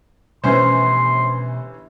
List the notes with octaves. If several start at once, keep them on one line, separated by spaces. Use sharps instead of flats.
G1 B2 E3 F3 A3 C#4 C5 C6